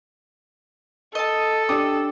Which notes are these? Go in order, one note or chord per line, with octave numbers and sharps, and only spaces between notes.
A4 D#5 A5
D4 G4 D6 D#6